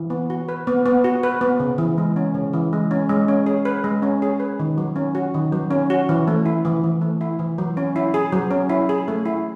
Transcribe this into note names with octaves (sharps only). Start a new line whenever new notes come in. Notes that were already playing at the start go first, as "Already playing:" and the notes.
Already playing: E3
B3
F#4
B4
B3
B3
F#4
B4
B3
C#3
E3
G#3
C#4
C#3
E3
G#3
C#4
G#3
C#4
G#4
B4
G#3
C#4
G#4
B4
D#3
F#3
C#4
F#4
D#3
F#3
C#4
F#4
E3
A3
E4
E3
E3
A3
E4
E3
F#3
C#4
E4
G#4
F#3
C#4
E4
G#4
A3
E4